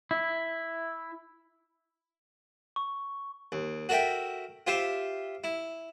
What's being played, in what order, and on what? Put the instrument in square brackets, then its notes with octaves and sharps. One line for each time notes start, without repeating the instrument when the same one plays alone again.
[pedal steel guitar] E4
[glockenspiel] C#6
[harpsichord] D#2
F#4 A4 A#4 E5 G5
F4 G4 C5 E5 F5
E4